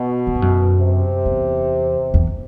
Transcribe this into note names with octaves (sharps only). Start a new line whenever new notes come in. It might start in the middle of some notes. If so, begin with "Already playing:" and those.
Already playing: B2
F#2
G2
F#2
C3
E2
E2